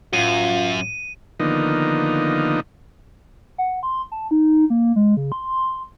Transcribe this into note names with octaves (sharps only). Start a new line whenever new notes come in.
A1 F#2 F4 D#7
D3 D#3 F3 A#3 B3 D#4
F#5
C6
A5
D#4
A#3
G#3
C#3
C6